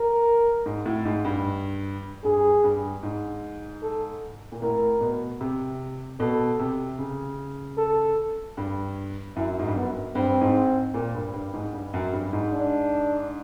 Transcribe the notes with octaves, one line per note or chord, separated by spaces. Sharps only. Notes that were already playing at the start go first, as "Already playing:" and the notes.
Already playing: A#4
G#2
A2
G#2
G2
G2 G#4
G2
G#2
A4
A#2
A2 A#4
B2
C3
B2 A4
C3
C#3
A4
G2
F#2 E4
G#2
G2
F#2 B3
G2 C4
G#2
A#2
G2
G2
G#2
G2
F#2
G2
G#2
D4